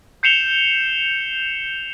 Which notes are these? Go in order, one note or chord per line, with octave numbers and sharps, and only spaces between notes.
G6 C7 C#7 E7 F7 G7